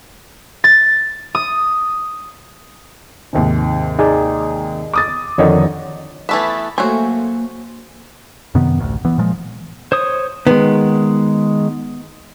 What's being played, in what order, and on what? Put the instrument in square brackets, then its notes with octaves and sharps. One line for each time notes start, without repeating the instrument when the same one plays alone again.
[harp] A6
D#6
[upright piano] D#2 G#2 C3
[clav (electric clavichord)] D#4 G#4 D5
[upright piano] D6 D#6 A6
[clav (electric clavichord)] F2 D3 D#3 [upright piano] D#4 C#5 D#5
[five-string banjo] E3 A3 B3 [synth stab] E5 A6 B6
[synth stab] F#3 A3 [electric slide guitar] A#3 G#5 [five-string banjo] F#4 C5
[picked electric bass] F#2 C3 D#3 B3
A1 D2
E3 B3
A#2 F3 G#3
[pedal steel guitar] C5 C#5 D#6
[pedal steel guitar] D#3 G#3 [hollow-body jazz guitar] B3